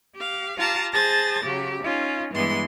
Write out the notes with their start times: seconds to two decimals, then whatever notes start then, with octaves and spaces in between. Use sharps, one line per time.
0.15 G4 F5
0.58 F4 G4 F5 A5 A#5
0.92 G#4 C5 A5 A6 A#6
1.45 C#3 F#3 G4
1.82 C#4 D#4 F4
2.34 G2 E3 G#3 B3 C6